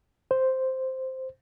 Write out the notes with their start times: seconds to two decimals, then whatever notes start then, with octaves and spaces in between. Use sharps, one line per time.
0.31 C5